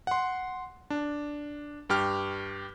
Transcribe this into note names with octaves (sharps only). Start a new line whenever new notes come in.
F#5 C6
D4
G2 G4 F6